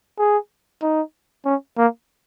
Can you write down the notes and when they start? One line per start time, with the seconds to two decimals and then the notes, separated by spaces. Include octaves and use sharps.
0.19 G#4
0.82 D#4
1.46 C#4
1.77 A#3